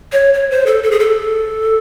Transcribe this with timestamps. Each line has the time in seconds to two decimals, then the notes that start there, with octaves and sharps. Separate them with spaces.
0.12 C#5
0.34 C#5
0.50 C5
0.66 A4
0.83 A4
0.91 G#4
1.00 A4